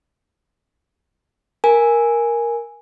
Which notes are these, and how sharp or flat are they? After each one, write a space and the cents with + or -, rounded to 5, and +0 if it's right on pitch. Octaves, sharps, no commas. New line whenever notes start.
A#4 +5 G#5 +0